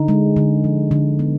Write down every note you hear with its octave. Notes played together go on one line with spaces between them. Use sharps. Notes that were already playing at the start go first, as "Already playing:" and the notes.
Already playing: D3 D#4
G#3
D3
F3
D3
B3